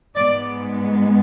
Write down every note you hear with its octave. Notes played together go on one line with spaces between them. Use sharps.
G#2 G#3 B3 D5